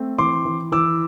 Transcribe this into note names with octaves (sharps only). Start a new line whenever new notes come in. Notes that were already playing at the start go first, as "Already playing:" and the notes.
Already playing: A3 C4
E3 C6 D6
E3
E3 D6 E6